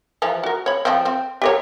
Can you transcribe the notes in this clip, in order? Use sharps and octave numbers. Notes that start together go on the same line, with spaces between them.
E3 F3 A#5
F#4 A#4
C#5 B5
F3 C4
C4
G4 A#4 C#5